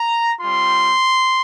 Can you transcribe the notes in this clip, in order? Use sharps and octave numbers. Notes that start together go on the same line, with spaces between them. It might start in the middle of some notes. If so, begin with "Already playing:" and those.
Already playing: A#5
G3 C4 F4 C6